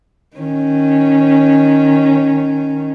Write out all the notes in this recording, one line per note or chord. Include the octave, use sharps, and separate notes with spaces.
D#3 C#4